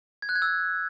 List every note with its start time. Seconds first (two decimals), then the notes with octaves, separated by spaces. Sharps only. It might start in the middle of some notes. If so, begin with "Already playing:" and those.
0.22 G#6
0.29 F#6
0.35 G#6
0.42 E6